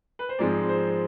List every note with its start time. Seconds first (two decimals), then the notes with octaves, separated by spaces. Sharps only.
0.19 B4
0.29 C5
0.39 G#2 F3 G#3 C4 D5
0.69 C5